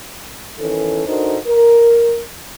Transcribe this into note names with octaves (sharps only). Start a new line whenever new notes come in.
D#3 E3 C#4 A4
D4 D#4 F#4 A4 A#4 C5
A#4